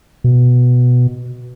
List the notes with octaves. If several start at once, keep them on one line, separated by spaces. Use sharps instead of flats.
B2